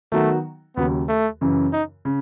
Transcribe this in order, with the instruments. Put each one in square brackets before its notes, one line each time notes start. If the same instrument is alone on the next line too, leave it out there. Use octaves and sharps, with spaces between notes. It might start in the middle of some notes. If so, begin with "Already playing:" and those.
[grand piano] D#3 F#3 B3 D#4 F#4 [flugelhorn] A3
[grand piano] D#2 C#3 F#3 [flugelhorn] B3
[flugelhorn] A3
[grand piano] F#2 C#3 E3
[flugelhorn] D#4
[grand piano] C#3